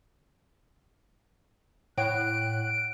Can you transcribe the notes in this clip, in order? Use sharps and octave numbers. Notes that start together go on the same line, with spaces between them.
A2 C#5 F#5 G5 F#6 D7